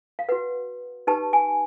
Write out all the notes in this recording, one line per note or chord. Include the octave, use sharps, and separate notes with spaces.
F5
F#4 B4 F#5
D#4 G4 B4 A5
G#5